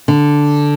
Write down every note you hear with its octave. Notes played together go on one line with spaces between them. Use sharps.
D3